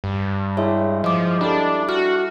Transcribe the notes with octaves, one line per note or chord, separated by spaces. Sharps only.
G2
G#3 E4 C#5
F3 D#5 D6
G3 D4 A4
F#4 F6